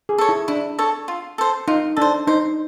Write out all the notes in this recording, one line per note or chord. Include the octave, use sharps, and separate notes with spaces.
G#4
A4 C#5
E4
D4 E4
A4 C#5
F4
A4 C5
D#4 F4
D4 A4 C5
D#4 C5